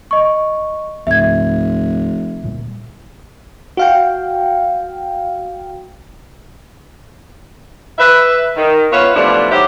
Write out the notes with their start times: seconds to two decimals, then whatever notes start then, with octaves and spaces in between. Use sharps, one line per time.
0.11 D#5 C#6
1.07 F1 C#2 G#2 C3 E5 G#6
2.43 D2 A#2 G3
3.77 F#4 F5 G5
7.99 B4 E5
8.56 D#3
8.91 B3 F4 B4 C#5 E5 F5
9.15 B2 E3 F3 G3 A3 D4
9.50 D#3 F#3 D4 G4 C5 E5